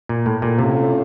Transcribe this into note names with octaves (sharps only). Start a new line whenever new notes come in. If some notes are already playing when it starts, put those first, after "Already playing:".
A#2
A2
A#2
A2 C3 A3 C#4 F4 C5